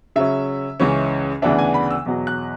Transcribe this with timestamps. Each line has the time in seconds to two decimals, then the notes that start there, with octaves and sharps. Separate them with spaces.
0.16 C#3 F#3 C#4 E5
0.80 C#2 C#3 E3 G#3 C#4
1.42 D2 C#3 E3 B3 D4 E5
1.59 G#5
1.74 B5
1.91 E6
2.06 E2 B2 F#3
2.27 F#6